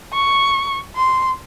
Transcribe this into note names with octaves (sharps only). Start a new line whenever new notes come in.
C#6
C6